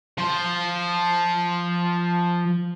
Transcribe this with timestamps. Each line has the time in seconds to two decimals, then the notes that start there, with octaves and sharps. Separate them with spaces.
0.18 F3 C5